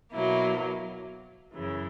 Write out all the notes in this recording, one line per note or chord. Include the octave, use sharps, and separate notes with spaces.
B2 F#3 A#3 E4
F#2 C#3 E3